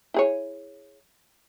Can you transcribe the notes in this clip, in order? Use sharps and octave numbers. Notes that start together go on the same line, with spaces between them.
E4 G#4 C#5